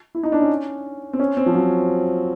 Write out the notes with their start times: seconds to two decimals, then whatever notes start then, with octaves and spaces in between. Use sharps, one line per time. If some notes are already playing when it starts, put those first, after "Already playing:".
0.15 E4
0.23 D#4
0.32 D4
0.41 C#4
1.13 C4
1.19 C#4
1.37 C4
1.46 F3
1.54 F#3